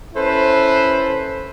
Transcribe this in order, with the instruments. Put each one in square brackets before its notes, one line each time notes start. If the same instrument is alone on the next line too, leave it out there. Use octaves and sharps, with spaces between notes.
[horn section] C#4 E4 A4 B4 C5